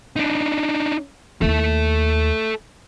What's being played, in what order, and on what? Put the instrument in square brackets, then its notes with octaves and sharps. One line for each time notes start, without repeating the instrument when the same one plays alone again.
[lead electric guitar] D4 D#4
[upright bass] D#2 E4 [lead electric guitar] A4 E5